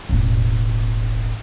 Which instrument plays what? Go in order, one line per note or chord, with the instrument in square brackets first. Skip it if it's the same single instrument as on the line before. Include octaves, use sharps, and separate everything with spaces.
[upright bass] E1 A1